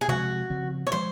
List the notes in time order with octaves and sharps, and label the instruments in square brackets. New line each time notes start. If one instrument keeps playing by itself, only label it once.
[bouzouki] G#4
[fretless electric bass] C3 F3 G#3 C4 [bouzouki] F#4
[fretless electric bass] C#3 F3 C4
[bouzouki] C#5
[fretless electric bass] F3 G#3 [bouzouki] C5